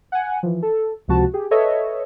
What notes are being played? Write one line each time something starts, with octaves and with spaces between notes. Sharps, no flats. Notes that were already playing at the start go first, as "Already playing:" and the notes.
F#5 G#5
E3 F3
A4
C#2 C3 F3 F#4 A5
G4 G#4
A4 B4 C#5 D#5 E5